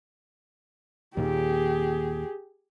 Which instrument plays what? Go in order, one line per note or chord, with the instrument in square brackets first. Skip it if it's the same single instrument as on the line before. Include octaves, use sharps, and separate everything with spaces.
[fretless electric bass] D#2 A#2 D#3 [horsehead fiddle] G4 G#4